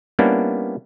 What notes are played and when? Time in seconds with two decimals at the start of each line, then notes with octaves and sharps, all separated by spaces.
0.19 G3 A#3 B3 C#4 D4 E4